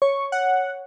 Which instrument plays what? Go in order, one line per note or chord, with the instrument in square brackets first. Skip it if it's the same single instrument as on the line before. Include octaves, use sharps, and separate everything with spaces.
[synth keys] C#5 [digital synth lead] C#6
[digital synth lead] F#5